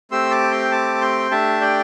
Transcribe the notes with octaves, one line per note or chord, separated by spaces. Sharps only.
A3 C4 G4 C6 E6
A5 D6
G5 C6
A5 D6
G5 C6
A3 D4 G4 E5 A5
D5 G5